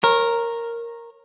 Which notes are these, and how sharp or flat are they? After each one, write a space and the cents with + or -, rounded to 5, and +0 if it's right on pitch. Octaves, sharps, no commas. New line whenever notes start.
A#4 +0 C#5 -25